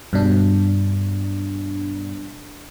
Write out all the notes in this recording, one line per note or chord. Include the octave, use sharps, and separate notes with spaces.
G2 B2 D4